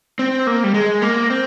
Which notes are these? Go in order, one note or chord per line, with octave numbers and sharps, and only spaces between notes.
C4
A#3
G3
G#3
A#3
C4